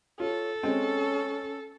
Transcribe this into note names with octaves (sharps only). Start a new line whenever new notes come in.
F4 A4 C#5
G#3 C4 C#4